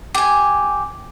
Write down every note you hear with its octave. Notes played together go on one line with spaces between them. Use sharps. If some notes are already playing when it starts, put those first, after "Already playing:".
G4 G#5